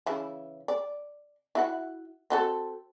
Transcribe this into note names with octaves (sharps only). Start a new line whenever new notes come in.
C#3 E3 E4
D5
E4 F#4 F#5
C4 F#4 A4